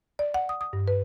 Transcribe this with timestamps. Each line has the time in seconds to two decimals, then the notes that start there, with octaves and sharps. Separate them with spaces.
0.19 D5
0.34 F#5
0.49 D#6
0.61 D#6
0.73 G2
0.88 B4